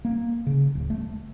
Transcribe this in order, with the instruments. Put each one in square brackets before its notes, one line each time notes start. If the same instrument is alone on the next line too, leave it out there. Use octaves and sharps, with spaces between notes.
[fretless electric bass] A#3
C#3
D1
A3